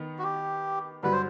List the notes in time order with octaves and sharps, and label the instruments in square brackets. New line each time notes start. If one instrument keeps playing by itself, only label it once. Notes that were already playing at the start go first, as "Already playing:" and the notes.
Already playing: [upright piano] D#3 B3
[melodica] F#4
G4
[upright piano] G2 D3 F#3 [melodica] B4
[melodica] C5